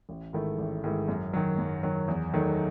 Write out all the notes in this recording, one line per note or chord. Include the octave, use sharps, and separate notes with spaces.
A1
G#2 D#3 A3 E4
A1
G#2 D#3 A3 E4
F#2
D#3 F#3
F#2
D#3 F#3
E2
D#3 F#3 A3 D#4